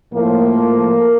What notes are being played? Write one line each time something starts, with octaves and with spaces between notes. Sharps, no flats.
A2 F3 A#3